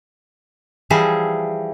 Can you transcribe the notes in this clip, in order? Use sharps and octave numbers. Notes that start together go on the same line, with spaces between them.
E3 F3 G3 G#4 E5